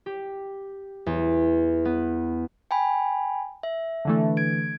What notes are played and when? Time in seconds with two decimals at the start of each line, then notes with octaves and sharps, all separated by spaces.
0.06 G4
1.06 E2
1.85 B3
2.71 G5 G#5 B5
3.63 E5
4.05 D3 E3 A3
4.37 G#6 D7